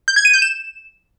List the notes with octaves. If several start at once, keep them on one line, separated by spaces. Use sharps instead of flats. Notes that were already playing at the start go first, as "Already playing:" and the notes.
G6
G#6
D#7
G6
E7